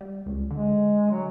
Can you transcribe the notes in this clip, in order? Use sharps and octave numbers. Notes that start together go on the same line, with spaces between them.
G3
C#2
D3 G#3
F#3